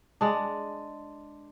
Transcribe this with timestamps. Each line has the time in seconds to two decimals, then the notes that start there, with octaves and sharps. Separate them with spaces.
0.21 G#3 D4